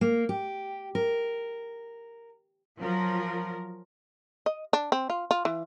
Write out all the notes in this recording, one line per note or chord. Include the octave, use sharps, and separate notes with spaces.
A#3
G4
A#4
F3 F#3 A#4
D#5
D4
C4
F4
F4
E3